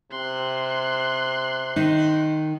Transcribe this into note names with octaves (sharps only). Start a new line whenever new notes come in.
C3 C6 F#6
D#3 D#4